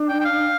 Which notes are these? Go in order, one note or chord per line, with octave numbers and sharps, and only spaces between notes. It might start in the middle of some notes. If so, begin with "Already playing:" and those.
Already playing: D4
G5
G5
F5